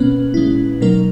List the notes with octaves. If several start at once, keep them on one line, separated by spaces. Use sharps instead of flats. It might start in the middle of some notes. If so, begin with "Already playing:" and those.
Already playing: B2 A#3 B3 C#4 B4
A#2 G#3 C#4 E4
B2 F#3 A#3 D#4 A#4